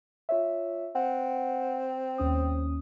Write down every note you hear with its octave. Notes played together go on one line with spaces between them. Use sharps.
F4 C#5 E5
C4 F#5
D#2 C#4 D#6